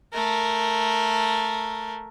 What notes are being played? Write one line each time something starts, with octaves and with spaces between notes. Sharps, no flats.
A3 A#4